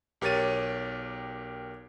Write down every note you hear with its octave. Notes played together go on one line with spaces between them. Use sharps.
B1 G4 A#4 C#5 A6 D#7